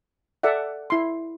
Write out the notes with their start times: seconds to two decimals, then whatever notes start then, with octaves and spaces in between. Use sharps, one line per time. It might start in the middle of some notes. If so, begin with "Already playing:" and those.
0.43 A4 D5 E5 F#5
0.90 E4 C6